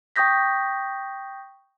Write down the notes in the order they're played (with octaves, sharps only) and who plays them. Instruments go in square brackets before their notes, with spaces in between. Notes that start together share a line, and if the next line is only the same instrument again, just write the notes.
[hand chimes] G5 C#6 D#6 G6 A#6 B6